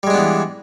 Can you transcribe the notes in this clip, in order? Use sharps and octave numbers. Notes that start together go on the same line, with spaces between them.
E3 G3 G#3 B3 D4